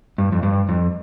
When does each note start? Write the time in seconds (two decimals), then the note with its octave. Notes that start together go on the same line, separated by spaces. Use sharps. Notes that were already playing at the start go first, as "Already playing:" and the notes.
0.18 G2
0.32 F2
0.43 G2
0.69 F2